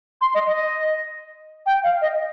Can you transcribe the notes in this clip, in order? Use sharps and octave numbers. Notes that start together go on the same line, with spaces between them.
C6
D#5
D#5
G5
F5
D#5